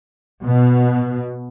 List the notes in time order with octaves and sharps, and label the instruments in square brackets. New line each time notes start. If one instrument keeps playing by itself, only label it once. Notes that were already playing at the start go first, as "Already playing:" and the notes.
[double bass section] B2